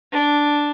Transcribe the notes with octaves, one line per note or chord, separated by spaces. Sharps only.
D4